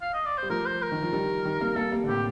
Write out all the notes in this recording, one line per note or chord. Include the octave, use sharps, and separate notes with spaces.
F5
D#5
D5
G3 C5
F3 A3 A#4
C5
A#4
D#3
F3
D#3 G3
D#3 G3
G3 A#3
G3 A#3 A4
G3 A#3
D3
A2 C3 G4